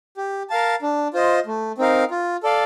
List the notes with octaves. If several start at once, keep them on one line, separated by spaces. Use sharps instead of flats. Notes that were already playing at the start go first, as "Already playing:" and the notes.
G4
A#4 F5 A5
D4
F4 C5 D#5
A3
C4 D#4 A#4 F5
F4
A4 D5 F5